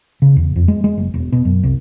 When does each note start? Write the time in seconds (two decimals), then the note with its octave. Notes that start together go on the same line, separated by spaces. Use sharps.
0.22 C#3
0.36 E2
0.56 F2
0.68 G#3
0.84 G#3
0.97 F#1
1.14 E1
1.32 B2
1.45 F#2
1.63 C2